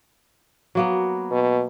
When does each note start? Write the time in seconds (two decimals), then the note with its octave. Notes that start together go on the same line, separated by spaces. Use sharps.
0.75 F#3 A#3 B3
1.31 B2